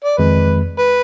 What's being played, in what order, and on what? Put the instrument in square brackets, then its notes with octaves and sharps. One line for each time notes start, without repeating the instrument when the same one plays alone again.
[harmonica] D5
[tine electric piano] F2 D#3 G#3 [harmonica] B4
[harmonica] B4